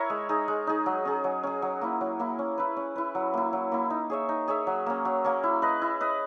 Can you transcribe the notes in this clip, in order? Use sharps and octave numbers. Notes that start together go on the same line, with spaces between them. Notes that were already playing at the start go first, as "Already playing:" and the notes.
Already playing: E4 A#4 C#5 E5
G#3
D#4 G#4
G#3
D#4 G#4
F#3
C#4 G#4
F#3
C#4 G#4
F#3
A#3 E4
F#3
A#3 E4
C#4
E4 B4
C#4
E4 B4
F#3
A#3 E4
F#3
A#3 E4
D#4
G#4 C#5 E5
D#4
G#4 C#5 E5
F#3
A#3 C#4
F#3
A#3 C#4
E4
B4 D#5
E4
B4 D#5